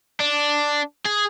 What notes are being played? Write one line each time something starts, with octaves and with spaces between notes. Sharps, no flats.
D4
G#4